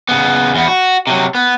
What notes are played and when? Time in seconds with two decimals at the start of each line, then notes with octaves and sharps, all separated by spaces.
0.09 C#3 B3
0.55 E2 B3
0.68 F#4
1.07 C3 F#3
1.35 B3